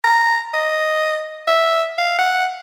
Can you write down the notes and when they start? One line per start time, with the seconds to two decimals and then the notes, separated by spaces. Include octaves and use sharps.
0.04 A#5
0.54 D#5
1.48 E5
1.98 F5
2.19 F#5